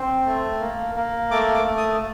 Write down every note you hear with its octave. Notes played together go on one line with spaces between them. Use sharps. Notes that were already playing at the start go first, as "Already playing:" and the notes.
Already playing: C4
A3
A#3
A#3
A3 D6
D6
A3
D#6